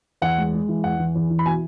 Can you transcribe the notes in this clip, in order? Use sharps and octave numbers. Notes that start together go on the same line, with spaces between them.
E2 F#5
G#3
G#3
E3
E2 F#5
E3
E2
E3
B5
B2 G#5